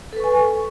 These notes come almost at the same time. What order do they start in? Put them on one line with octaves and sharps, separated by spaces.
A4 B4 C#6 G#5